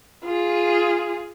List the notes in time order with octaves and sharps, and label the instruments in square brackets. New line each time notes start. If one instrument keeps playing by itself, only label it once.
[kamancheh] F4 G#4